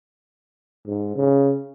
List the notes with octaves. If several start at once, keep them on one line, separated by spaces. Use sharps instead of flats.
G#2
C#3